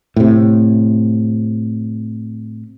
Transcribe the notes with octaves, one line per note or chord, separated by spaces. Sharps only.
A2 C3